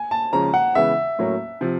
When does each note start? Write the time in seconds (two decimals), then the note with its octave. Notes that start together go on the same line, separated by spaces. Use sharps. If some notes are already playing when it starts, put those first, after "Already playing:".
Already playing: G#5
0.11 A5
0.33 C#3 F3 G#3 C#4 A#5
0.54 F#5
0.75 C#3 E3 G#3 B3 E5
1.19 A2 F#3 A#3 C#4
1.61 C3 F3